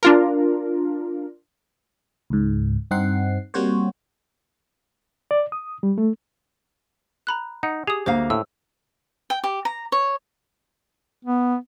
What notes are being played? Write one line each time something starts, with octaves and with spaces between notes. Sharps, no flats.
D4 F4 A#4
C#2 G#2
G2 C4 D#4 F#5 C7
G3 A#3 C4 F#4 C5 C#5
D5
D#6
G3
A3
A#5 B5 F#6
D#4 F#5
G4 G#4 D#6
D2 A#3 C5 F5
A2 E6
G5
G4
A#5
C#5
B3